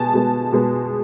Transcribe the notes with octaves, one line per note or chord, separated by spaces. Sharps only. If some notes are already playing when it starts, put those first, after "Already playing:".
Already playing: B2 G#3 B3 G#5 A5
B2 G#3 B3
B2 G#3 B3